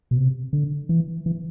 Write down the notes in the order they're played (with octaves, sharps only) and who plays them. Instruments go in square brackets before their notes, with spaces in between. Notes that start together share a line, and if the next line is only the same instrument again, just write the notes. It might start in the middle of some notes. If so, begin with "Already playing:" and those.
[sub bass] B2
C3
D3
E3
E3